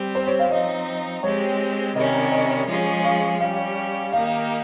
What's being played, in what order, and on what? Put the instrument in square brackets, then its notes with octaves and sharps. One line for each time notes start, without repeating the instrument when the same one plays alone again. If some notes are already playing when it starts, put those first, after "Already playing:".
Already playing: [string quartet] G3 C4 G4
[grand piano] C5
C#5
F5
[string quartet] F3 C4 D#4 [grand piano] D#5
[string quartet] G#3 C4 G4 [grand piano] C#5
[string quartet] C3 D#3 G3 C#4 [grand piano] D#5
[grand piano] D#5
[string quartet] F3 G#3 C#4 F4 G#4
[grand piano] F5
[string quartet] G3 C#4 G4 [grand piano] F5
[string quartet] D#3 A#3 D#4 G4 [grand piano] F5